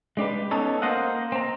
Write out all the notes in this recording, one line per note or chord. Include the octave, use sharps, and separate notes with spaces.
G#3 D4 G4 B4
B3 C#4 D#4 A4 C#5
A#3 C5 D#5 F5 F#5
C4 A#5